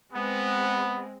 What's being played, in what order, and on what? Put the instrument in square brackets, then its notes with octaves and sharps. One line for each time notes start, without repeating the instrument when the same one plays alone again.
[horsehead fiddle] G#3 C4 [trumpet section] B3